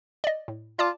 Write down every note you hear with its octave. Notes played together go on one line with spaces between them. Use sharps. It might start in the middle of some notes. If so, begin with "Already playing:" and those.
D5 D#5
A2
F4 D5 A5 D6